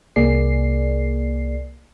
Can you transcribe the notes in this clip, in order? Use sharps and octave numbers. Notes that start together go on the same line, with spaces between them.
C2 A#3 G#4 D5 C7